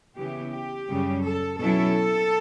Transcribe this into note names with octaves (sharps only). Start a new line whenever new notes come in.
C#3 E3 B3 E4 G4
G4
F#2 C#3 G3 C#4
A4
B2 F#3 C#4 E4 A4